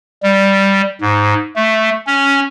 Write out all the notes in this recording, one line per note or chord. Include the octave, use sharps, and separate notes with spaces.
G3
G#2
A3
C#4